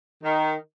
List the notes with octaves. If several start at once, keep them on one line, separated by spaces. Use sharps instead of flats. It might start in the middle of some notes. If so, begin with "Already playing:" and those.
D#3